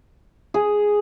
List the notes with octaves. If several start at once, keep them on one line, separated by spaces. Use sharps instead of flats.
G#4